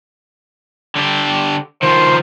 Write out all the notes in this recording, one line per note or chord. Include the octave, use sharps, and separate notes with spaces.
D3 G4
D#3 F3 C5